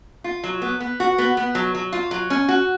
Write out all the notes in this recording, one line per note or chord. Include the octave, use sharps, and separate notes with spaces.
F4
F#3
B3
B3
F#4
B3
B3
F#3
F#3
F4
F#3
C#4
F#4